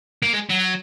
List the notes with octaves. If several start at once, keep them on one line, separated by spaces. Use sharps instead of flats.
A#3
G#3
F#3